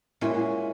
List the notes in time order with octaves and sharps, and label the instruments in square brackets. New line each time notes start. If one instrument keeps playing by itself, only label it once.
[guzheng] A#2 G#3 C#4 F#4 [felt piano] E4